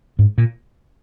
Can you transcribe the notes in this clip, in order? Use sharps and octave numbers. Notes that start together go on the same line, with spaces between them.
G#2
A#2